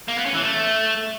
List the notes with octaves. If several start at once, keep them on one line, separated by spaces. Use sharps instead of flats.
A#3
B3
C#4
E3
A3